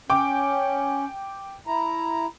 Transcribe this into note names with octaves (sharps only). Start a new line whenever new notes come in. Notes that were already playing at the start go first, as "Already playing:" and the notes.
C#4 G5 D6
E4 A#5